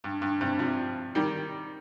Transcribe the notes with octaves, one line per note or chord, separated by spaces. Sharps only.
G2
G2
G2 C3
C3 F3
D#3 G3